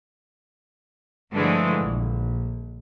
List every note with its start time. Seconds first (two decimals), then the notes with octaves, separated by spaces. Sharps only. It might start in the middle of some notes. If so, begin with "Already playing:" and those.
1.32 G2 D3 E3 F3 G#3 A3
1.79 A#1